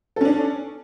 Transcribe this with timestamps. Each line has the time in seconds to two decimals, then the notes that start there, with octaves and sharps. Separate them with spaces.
0.16 A4
0.21 C#4
0.25 D4